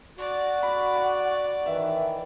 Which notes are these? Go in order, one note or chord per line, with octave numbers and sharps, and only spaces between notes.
F#4 D5
B5
F#5
D#3 E3 E5